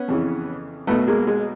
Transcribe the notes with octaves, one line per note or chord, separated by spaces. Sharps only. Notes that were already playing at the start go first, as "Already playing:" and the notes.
Already playing: B3 C#4
F2 C#3 E3
B1 B2 A3 B3
G#3 A#3
G#3